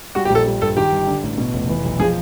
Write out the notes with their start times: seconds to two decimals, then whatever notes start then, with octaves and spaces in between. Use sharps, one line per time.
0.15 G3 F#4
0.25 G4
0.30 A#1
0.35 A4
0.47 G3
0.62 G2 A4
0.77 D#3 G4
0.92 G1
1.07 D3
1.23 A1
1.38 B2
1.54 F1
1.69 E3
1.84 B1
2.00 F3 G#4